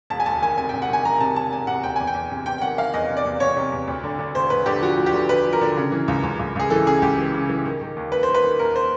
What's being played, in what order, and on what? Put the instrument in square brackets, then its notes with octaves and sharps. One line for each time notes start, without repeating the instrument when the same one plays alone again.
[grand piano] E1 A5
G#5
D2 A5
D#3 G#5
C3 G#5
C3 G5
F#5
D#3 G#5
D#3 A#5
C3 A5
D#3 A5
E1 G#5
C3 F#5
D2 G5
E2 G#5
G5
E2
C3
E2 G5
G5
D#3 F#5
D#3 F5
E2 D#5
C3
D5
E2
E2 C#5
C3
E2
D2
D3
D3
E1 C5
E1 B4
D3 G4
F3 F#4
D2
G4
D3
F3 B4
F3
A#4
D3
C#3
E3
C#2
C#2
C#2
C#2 G#4
E3 A4
C#3 G#4
C#2 G4
E3
C#3
E3
D#3
D#3
D#2
D#3 B4
C5
D#3
B4
D#3
D#2 A#4
C5